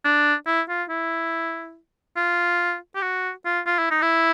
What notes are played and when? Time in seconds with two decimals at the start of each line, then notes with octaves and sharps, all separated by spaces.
0.04 D4
0.46 E4
0.68 F4
0.89 E4
2.17 F4
2.95 G4
3.02 F#4
3.45 F4
3.66 F4
3.78 E4
3.91 D#4
4.02 E4